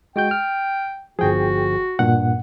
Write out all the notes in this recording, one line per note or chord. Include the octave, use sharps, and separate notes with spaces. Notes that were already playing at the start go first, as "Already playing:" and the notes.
G#3 F#4 G5 G6
F6
G1 F3 F#4 G#4 G5
G2 A#2 F#5